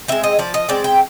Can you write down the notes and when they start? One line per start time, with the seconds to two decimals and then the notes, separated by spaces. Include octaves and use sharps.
0.08 G#3 C4 E5
0.24 D#5
0.39 F3 D5
0.54 D#5
0.69 G#3 C4 D5
0.84 G5